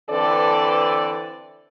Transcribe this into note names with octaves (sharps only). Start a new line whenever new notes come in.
D3 E3 C4 A4 B4 D5